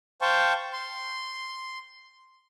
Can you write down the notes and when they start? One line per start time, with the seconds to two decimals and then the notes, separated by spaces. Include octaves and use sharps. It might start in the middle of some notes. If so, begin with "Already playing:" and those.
0.21 C5 F5 G5 A5 C#6
0.73 C6